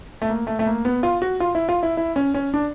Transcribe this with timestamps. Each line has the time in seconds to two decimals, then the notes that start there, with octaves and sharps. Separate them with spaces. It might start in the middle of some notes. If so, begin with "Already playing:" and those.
0.22 A3
0.29 A#3
0.47 A3
0.59 A3
0.66 A#3
0.85 B3
1.03 F4
1.22 F#4
1.40 F4
1.55 E4
1.69 F4
1.83 E4
1.97 E4
2.16 C#4
2.34 C#4
2.54 D4